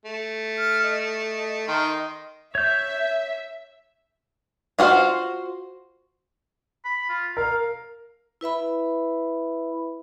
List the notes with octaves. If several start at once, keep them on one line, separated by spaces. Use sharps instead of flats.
A3
F6
D#5
D#3 D#5 C6
C#5 E5 G6
F4 F#4 A#4 C5 F5
B5
F4
A#4 F5
E4 B4 E5 B5